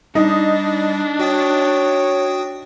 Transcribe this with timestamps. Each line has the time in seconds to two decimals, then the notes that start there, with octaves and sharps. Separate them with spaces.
0.15 G3 D4 D#4
1.19 F#4 C#5 G5 D#6